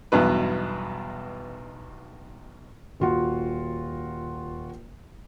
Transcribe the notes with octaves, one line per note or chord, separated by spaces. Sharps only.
B1 E2 G2 B2 B4
D#1 F4 F#4